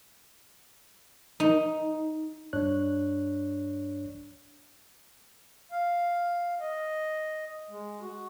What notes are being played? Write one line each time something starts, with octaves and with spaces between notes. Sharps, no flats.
D#4
G2 D4 C#5 F#6
F5
D#5
G#3
F#4